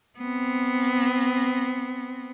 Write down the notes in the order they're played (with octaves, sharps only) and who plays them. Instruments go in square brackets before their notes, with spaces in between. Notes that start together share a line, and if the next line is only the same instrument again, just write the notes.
[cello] B3 C4